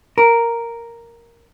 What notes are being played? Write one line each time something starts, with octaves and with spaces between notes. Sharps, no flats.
A#4